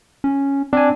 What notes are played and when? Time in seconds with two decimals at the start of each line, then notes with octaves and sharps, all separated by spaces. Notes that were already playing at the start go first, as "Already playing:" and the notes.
0.24 C#4
0.73 C4 D4 G#5